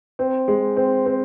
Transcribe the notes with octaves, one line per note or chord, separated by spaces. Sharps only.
C4
G#3
C4
C4